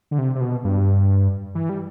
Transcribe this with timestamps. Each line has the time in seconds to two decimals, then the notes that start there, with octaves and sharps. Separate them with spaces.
0.11 D3
0.18 C3
0.35 C3
0.41 B2
0.64 G2
1.55 E3
1.69 G3